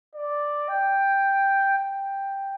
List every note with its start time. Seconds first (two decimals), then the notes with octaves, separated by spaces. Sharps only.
0.14 D5
0.68 G5
1.78 G5